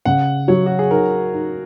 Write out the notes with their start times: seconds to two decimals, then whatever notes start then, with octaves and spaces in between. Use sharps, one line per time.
0.05 C#3 F#5
0.48 F#3 C#5
0.66 F#4
0.79 G#4
0.91 D#4 A#4
1.34 D#4